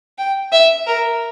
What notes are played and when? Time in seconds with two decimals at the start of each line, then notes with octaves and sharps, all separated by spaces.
0.18 G5
0.52 E5
0.87 A#4